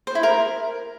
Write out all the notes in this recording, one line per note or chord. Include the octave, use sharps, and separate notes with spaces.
C5
E4
A#4